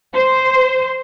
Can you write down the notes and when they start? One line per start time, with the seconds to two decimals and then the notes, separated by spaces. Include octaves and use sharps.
0.14 C5